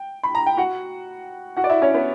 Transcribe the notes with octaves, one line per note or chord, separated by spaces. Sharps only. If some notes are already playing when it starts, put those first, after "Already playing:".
Already playing: G5
B5
A#5
G5
F#4 F#5
F#4 F#5
D5
E4 E5
C#4 C#5
B3 B4